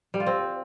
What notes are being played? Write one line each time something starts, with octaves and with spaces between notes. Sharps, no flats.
G3
F4
C4